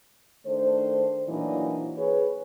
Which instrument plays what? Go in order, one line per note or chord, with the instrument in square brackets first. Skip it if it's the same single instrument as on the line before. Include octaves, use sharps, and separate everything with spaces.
[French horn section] D#3 A3 D4 C5
A#2 E3 F#3 A#3 D4 D#4
G#4 B4 C#5